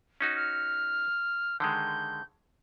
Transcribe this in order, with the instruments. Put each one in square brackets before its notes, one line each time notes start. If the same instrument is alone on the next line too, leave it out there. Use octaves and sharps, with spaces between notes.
[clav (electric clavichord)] C#4 D#4 F#4
[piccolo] F6
[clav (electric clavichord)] D3 D#3 G#3 [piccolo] G6